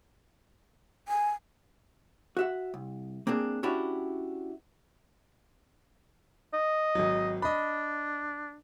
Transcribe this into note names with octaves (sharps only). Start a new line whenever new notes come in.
G#5
F#4 E5 F#5
C2
A#3 C4 D4 G#4
C#4 D4 E4 F#4 G4
D#5
G#1 F#3
D4 D#5 B5